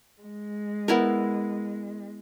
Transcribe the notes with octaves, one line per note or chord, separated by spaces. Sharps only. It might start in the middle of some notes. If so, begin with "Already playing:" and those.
G#3
B3 E4 A#4